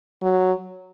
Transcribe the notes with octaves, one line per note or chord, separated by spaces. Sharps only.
F#3